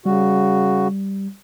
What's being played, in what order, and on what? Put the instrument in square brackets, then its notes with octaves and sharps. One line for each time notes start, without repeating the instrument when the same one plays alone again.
[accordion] C#3 F#4 [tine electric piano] G3